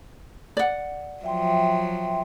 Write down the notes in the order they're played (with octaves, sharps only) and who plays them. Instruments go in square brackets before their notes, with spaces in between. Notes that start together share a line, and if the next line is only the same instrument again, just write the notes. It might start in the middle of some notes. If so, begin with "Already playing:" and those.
[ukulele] D5 F#5
[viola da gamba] F3 F#3 [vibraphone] E5 G5 C6